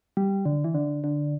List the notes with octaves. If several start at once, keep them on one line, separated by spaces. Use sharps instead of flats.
G3
D3
E3
D3
D3